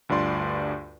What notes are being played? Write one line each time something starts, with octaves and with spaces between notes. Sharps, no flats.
D2 G2 F4 D5 C6